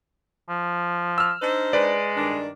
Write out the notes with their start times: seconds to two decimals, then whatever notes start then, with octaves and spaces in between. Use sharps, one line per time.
0.49 F3
1.18 E6 F6
1.41 D4 D#4 C5
1.73 G#3 B4 D5
2.16 G2 D#3 D4